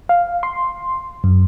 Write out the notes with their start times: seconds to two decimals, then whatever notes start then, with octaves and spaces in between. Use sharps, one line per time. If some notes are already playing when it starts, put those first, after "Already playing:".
0.09 F5
0.43 C6
1.24 F#2